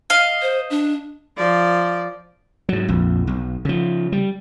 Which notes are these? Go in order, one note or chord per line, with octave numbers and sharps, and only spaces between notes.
D#5 F5
C5
D4
F3 D5
G#2 F#3
A#1 F2
B1
C#3 F3
G3